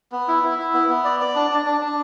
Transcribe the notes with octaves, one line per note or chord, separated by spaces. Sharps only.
B3
E4
E4
E4
B3
B3
D5
D5
D4
D4
D4
D4